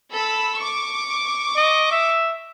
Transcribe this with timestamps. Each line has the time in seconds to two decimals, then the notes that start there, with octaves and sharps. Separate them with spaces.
0.12 A4 B5 E6
0.57 C#6 D6
1.57 D#5
1.92 E5